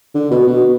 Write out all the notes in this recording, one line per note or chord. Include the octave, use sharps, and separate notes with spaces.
D3
B2
B2